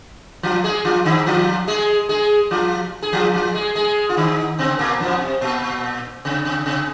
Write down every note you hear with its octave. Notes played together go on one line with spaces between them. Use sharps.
F3 F4
G#3 G#4
F3 F4
D#3 D#4
F3 F4
G#3 G#4
G#3 G#4
F3 F4
G#4
F3 F4
F3 F4
G#3 G#4
G#3 G#4
F4
D#3 D#4
C3 C4
A#2 A#3
F2 F3
C3
A#2
C3
C3
C3